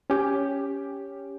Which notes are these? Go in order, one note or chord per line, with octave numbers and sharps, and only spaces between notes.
C#4 G4